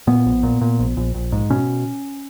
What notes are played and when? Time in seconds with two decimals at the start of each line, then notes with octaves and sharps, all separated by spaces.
0.07 A#2 B3
0.26 A#1
0.43 A#2
0.61 A#2
0.79 A#1
0.97 A#1
1.15 A#1
1.32 G#2
1.50 B2 C#4